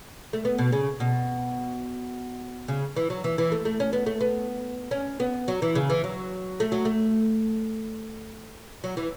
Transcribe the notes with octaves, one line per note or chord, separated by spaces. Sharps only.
A3
B3
B2
C#3
B2
C#3
E3
F#3
E3
E3
A3
A3
C#4
B3
A3
B3
C#4
B3
F#3
E3
C#3
E3
F#3
A3
F#3
A3
F#3
E3